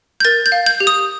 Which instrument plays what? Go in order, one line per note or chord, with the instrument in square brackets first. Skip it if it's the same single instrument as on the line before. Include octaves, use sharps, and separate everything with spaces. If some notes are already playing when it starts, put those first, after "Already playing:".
[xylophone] G6
A#4 A6
G6
F5
G6
G4
D#6